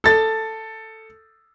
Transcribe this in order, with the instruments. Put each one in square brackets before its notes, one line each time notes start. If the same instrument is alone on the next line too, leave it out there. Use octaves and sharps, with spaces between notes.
[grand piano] A4 A6